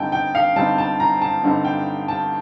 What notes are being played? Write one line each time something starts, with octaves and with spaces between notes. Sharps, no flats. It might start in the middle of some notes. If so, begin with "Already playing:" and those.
Already playing: G2 D3 G3 C4 D#4 G5 A5
G5
F5
G2 D3 G3 C4 D#4 A5
A5
A#5
A5
G2 D3 G3 C4 D#4
G5
A5